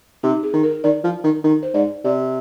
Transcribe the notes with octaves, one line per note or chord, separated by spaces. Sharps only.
C3 D#4
G#4
D#3
A#4
D#3 D5
F3
D#3
D#3
C5
G#2 D5
C3 D5